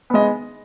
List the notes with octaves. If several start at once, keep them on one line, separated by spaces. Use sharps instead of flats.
G#3 B3 D#5